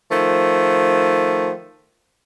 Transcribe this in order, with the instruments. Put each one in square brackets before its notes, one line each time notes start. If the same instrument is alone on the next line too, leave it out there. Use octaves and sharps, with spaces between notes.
[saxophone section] D#3 F3 A3